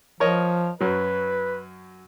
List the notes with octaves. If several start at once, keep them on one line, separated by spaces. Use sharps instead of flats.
F3 A#4 C#5 D#5
F#2 F#3 B4